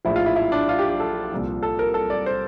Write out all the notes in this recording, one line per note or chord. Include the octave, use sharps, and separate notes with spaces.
A#1 A2 F3 E4
F4
E4
E4
D4
F4
G4
G4
A4
C2 A#2 F3
A4
A#4
A4
D5
C5